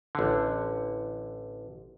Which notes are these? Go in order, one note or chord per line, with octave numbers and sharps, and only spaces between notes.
A1 D3